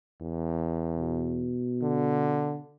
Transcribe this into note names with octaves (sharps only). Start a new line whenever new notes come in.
E2
B2
D3